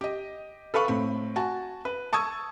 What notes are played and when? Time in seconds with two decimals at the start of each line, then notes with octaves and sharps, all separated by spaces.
0.01 G4 D#5
0.74 A4 B4 F5 B5 C#6
0.88 A2 C4 B5
1.36 F#4 G#5 A5
1.85 B4
2.13 A5 C#6 D#6 E6 G#6